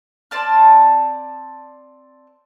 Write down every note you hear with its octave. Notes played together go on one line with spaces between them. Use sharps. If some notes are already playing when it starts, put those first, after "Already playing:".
C4 D5 A5 F6